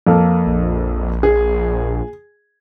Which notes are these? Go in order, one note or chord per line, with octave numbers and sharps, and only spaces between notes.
F2 A#3 A4
A#1
G#4